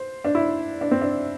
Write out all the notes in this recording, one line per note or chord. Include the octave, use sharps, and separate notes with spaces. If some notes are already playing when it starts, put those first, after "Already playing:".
Already playing: C5
D4
E4
D4
C4
D4